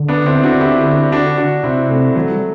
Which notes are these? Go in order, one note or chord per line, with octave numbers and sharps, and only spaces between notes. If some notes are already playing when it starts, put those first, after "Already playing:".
Already playing: D3
B3 D4
C4 E4
D4 F#4
E4 G4
D4 F#4
D4 F#4
C3 C4 E4
A3 C4
E3 F#3 A3
G3